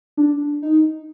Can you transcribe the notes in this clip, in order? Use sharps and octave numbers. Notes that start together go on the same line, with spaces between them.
D4
D#4